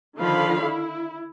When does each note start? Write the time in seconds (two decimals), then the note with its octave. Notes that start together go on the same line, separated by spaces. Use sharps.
0.17 D3 D#3 F3 F5 B5
0.63 E4